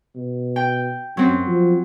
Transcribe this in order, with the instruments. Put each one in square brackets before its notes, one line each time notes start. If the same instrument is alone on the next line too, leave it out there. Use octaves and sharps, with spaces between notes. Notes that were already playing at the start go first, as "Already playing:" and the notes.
[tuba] B2
[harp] G5
[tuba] F#2 [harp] F#3 C4
[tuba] F3